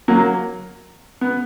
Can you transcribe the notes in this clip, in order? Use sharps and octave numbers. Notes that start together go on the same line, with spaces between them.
F#3 A#3
B3